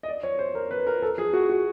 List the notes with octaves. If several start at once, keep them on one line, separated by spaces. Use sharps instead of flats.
D#5
D5
C#5
C5
A#4
B4
A#4
A4
G#4
F#4
F#4